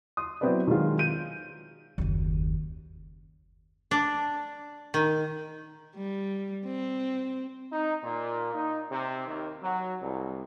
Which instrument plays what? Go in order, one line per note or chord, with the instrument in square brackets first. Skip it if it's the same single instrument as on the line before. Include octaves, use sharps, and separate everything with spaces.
[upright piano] C6 D#6
F#3 B3 C4 E4 B4 D5
D#3 F#3 G#3 F4
G6 D#7
[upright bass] F#1 D#2
[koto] D4
D#3
[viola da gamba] G3
C4
[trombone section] D#4
A#2
D#4
C3
D#2
F#3
C2